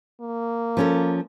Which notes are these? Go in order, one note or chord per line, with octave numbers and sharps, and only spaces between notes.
A#3
F3 C#4 A4